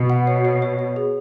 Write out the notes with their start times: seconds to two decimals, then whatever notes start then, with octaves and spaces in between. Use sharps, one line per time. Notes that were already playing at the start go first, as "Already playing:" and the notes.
Already playing: B2
0.10 F#5
0.27 C#5
0.45 C#5
0.62 C#5
0.79 C#5
0.96 G#4